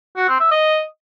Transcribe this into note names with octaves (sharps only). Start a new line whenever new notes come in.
F#4
C4
E5
D#5